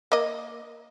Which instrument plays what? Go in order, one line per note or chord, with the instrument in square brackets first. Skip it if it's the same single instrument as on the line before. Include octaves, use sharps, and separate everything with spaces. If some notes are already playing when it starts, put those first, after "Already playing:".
[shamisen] A#3 D#5